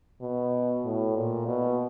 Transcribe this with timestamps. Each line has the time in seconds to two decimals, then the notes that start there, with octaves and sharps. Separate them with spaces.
0.21 B2
0.85 A2
1.16 A#2
1.48 B2